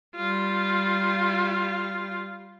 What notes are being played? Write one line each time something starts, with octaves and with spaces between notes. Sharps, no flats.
G3 F4